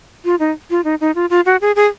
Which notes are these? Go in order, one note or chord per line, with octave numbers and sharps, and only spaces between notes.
F4
D#4
F4
D#4
D#4
F4
F4
F#4
G#4
G#4